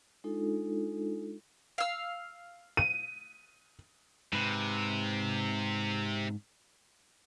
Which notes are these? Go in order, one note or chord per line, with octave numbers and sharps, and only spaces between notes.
G#3 D4 D#4 F4 A4
F5 E6
D#7
G#2 C3 B4